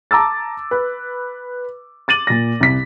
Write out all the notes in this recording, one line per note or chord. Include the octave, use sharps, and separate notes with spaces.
A5 A#5 D6 E6 A6
B4
D6 A6 D#7 F#7
A#2 A#6
C2 B6